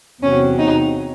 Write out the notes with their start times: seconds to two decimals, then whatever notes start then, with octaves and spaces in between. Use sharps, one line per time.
0.22 E2 C3 F#3 C#4
0.59 D#4